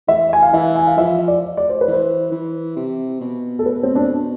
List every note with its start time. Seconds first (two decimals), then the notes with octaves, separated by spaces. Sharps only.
0.08 E3 E5
0.33 G#5
0.43 F5
0.53 E3 E5
0.76 G#5
0.87 F5
0.97 F3 E5
1.28 D5
1.57 D5
1.69 C5
1.81 B4
1.88 E3
1.93 C5
2.32 E3
2.76 C3
3.21 B2
3.59 A4
3.66 B4
3.83 C4
3.95 D4